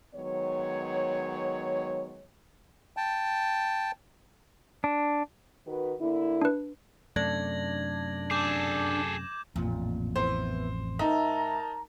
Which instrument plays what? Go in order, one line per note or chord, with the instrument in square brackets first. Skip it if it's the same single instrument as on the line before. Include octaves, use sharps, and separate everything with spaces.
[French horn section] D#3 F#3 G#3 B3 C#5
[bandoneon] G5 A5
[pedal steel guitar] D4
[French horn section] D#3 F#4 B4
D3 A#3 E4
[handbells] D4 B4
[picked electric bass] F#2 C3 A3 [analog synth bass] D4 [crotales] G#6 A#6 F#7
[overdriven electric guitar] G#4 A4 [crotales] D6 G6 E7
[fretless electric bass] A1 F2 [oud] A#2
[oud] E3 B3 [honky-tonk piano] C5
[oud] G#2 E5 [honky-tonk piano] D#4 [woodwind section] A#4 A5 A#5